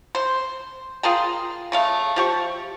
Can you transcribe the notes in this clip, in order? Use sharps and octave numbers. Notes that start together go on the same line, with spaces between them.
C5
F4 G#4 A#4 G5
C#3 A3 F5
F3 G4 C#6